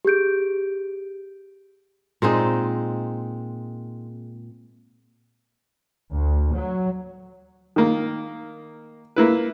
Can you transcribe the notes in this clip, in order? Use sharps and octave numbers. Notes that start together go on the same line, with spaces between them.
G4 G#4 G6 D7
A#2 G#3 C4 D#4
D2
F#3
D#3 A#3
A#3 E4 B4